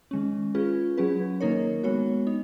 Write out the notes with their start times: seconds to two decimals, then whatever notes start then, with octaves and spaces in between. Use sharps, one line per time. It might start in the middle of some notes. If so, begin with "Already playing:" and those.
0.11 D#3 G#3 C#4
0.55 C#4 F4 G#4 B4
0.98 F#3 C#4 G#4 B4
1.41 D#3 A#3 D#4 A#4 C#5
1.83 G#3 B3 F#4 C#5
2.27 D#4